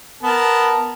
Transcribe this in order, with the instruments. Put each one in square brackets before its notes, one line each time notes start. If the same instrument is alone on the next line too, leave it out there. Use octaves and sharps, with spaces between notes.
[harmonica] B3 A#4 A5